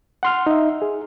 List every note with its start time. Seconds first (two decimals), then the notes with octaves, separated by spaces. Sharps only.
0.23 F#5 C6 F6
0.47 D#4 E5
0.82 G#4